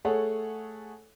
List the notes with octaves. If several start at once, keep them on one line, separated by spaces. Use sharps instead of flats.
A3 G#4 A4 C#5 F#5